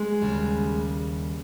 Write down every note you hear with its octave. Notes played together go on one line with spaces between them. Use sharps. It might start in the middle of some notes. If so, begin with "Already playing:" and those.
Already playing: G#3
D#2 C#3 G3